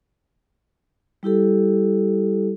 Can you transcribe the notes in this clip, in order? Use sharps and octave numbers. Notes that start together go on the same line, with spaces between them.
G3 E4 G4 A4